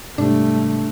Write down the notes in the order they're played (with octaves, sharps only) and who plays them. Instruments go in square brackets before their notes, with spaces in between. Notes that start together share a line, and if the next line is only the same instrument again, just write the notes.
[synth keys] G#2 C3 [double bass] G3 A3 [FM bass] D4